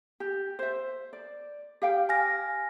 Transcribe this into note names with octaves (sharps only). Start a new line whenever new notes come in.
G4
C5 E5
D5
G4 F5 G5
G#5 F6 A#6